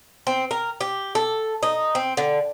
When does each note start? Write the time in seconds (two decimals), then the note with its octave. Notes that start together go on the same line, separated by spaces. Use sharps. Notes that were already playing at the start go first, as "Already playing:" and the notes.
0.27 C4
0.51 A#4
0.81 G4
1.15 A4
1.63 D#4
1.95 C4
2.17 D3